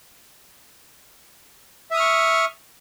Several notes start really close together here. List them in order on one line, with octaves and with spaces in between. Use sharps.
E5 D#6 F6 C#6